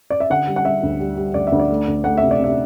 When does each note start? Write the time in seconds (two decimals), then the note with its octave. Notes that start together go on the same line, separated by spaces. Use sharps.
0.10 D5
0.20 E5
0.30 D3 F#5
0.47 G3
0.56 F#5
0.65 G3 E5
0.83 D2
1.00 G3
1.17 G3
1.34 D2 D5
1.47 E5
1.52 D2
1.60 D5
1.70 A3
1.87 D2
2.04 A3 F#5
2.17 C3 E5
2.31 D5
2.39 C3 E5